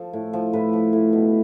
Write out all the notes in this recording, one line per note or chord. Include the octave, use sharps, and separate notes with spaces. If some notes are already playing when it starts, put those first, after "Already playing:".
Already playing: F3 A4
A2
F3
A2 B4
F3
A2
B2